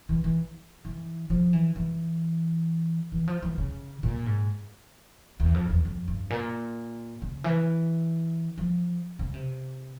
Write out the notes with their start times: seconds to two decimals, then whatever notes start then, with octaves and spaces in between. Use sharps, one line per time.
0.09 E3
0.24 E3
0.85 E3
1.30 F3
1.53 E3
1.76 E3
3.12 E3
3.28 F3
3.42 E3
3.58 C#3
4.03 A#2
4.26 G#2
5.40 E2
5.54 F2
5.70 E2
5.85 F2
6.08 G2
6.30 A#2
7.22 C#3
7.44 E3
8.58 F3
9.19 C#3
9.34 C3